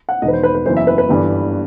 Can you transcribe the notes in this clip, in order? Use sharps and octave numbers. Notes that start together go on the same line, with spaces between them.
F#5
E1 E2 D#3 D#5
B4
C5
B4
B4
F#1 F#2 E3 B3 C5
E5
B4
B4
G1 G2 E3 G3